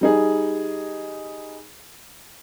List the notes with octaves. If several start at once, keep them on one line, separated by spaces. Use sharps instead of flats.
G3 D#4 G#4